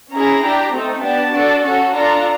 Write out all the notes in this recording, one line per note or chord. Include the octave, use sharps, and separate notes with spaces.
C#4 E4 G#4 A#5
D4 G4
A3 C4 D#4
B3 D4 G4 A5
D4 F#4 A4
C#4 F#4 A4
D4 F4 A4 A#5